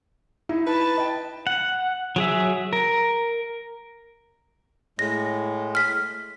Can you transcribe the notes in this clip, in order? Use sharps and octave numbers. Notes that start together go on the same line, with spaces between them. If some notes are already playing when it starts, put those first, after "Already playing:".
D#4 E4
B4 A5
D#5 G5
F#5
F#3 G#4 E5
A#4
A2 G#3 A#6
F6 B6